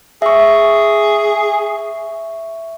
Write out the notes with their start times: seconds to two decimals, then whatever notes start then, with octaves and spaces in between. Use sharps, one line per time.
0.22 G#4 E5 C#6